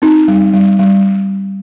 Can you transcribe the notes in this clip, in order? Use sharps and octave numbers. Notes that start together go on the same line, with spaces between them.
C4 D#4
G3
G3
G3